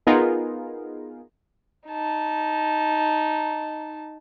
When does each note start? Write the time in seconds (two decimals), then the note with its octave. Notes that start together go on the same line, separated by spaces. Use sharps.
0.07 B3 D#4 F4 G#4 A#4
1.88 D#4 A5